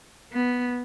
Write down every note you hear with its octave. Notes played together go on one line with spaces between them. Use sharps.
B3